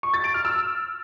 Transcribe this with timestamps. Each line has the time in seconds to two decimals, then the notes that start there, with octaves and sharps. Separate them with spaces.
0.03 C#6
0.14 A6
0.24 D7
0.34 F6
0.45 E6